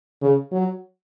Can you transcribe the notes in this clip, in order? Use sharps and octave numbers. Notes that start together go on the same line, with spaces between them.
C#3
F#3